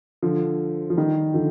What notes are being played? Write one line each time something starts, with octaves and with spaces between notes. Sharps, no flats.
D3 F3
F3
D#3 G3
D3 F3